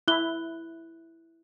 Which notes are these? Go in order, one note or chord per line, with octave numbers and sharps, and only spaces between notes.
E4 F#6 G7